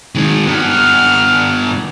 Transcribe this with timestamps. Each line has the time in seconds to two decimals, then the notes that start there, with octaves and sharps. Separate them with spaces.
0.15 D#3 G#3
0.47 G2 B3 F6